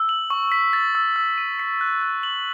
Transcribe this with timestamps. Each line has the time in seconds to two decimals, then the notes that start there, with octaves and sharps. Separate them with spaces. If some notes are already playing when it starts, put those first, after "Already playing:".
Already playing: E6
0.09 F#7
0.30 C#6
0.52 B6
0.73 A6
0.95 E6
1.16 E6
1.38 D#7
1.59 B6
1.81 F#6
2.02 F#6
2.23 F#7